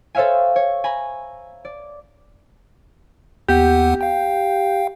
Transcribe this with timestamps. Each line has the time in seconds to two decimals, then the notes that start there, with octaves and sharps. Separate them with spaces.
0.15 A4 C5 C#5 E5 F5 G#5
0.56 C#5
0.84 G#5 A#5 B5
1.65 D5
3.49 D#2 B3 G4 F#5
4.01 F5 G5